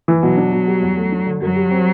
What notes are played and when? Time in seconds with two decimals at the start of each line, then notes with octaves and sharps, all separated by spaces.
0.08 E3
0.23 B2 F#3
0.38 D4
0.52 B2
0.67 G3
0.82 E2
0.97 A3
1.12 D4
1.26 D3
1.42 F#2 F#3
1.56 G3
1.71 C4